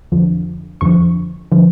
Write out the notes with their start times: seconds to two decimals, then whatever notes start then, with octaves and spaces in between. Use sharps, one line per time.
0.12 F2 D3 F3
0.81 F2 D3 F3 C#6
1.52 D3 F3